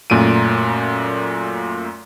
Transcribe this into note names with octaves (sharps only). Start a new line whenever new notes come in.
F#2 A#2 A3 D7 D#7